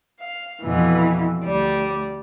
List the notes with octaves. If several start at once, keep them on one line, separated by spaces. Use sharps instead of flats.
F5
F2 B2 E3
D2 G3 D5